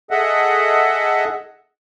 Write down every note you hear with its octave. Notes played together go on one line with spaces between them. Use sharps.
G#4 A4 D#5 E5 F#5